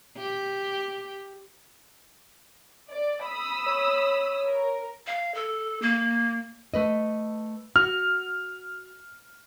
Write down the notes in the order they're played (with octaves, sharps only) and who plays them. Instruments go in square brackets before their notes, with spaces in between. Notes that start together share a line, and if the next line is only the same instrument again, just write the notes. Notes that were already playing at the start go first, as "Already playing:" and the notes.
[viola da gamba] G4
[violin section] D5
B5 D#6 E6
[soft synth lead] C#5
[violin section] A#4
[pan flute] F5
A4
A#3
[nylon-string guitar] A3 B4 D#5
[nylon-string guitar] F#4 [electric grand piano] F6